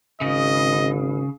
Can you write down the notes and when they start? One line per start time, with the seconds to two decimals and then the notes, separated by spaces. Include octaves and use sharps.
0.21 G#1 C#3 D#5